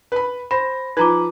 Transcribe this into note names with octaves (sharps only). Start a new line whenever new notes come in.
B4 B5
C5 B5 A#6
F3 D#4 B4 A#5 D6